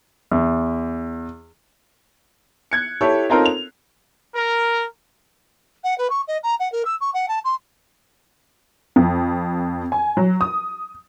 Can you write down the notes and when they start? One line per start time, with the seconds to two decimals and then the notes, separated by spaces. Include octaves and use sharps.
0.31 E2
2.72 F#6 G#6 C#7
3.01 E4 G4 A4 C#5
3.29 C4 C#4 D#4 F4 A4 A#4
3.45 F7
4.34 A#4
5.84 F#5
5.98 B4
6.10 C#6
6.27 D#5
6.43 A#5
6.59 F#5
6.72 A#4
6.85 E6
7.00 C#6
7.14 F#5
7.28 A5
7.44 C6
8.96 F2
9.92 G#5
10.17 F#3
10.41 D#6